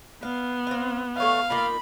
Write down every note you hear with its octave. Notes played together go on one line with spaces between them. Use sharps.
B3 F5
C4 F5
A3 C#5 E5 F5
A#3 D#4 F4 B5